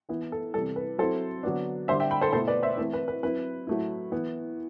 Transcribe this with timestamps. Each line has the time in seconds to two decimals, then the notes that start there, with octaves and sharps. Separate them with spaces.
0.09 E3 B3 E4
0.32 A4
0.54 C3 E3 G3 A4
0.76 B4
0.98 F#3 C4 E4 A4 C5
1.43 D3 F#3 B3 D4
1.88 D3 G3 D4 C5 E5
2.00 E5 G5
2.11 G5 B5
2.21 A4 C5
2.33 B2 A3 E4 A4 C5
2.47 B4 D5
2.63 C5 E5
2.77 E3 A3 C4 E4 B4
2.93 B4
3.08 B4
3.23 F#3 C4 E4 B4
3.67 A2 F#3 A3 E4
4.12 E3 B3 E4